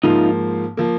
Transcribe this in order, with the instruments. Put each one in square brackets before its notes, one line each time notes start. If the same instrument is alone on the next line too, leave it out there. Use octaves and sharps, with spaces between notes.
[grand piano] G#2 F3 A#3 [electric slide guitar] D#4 F4
[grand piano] F3 A#3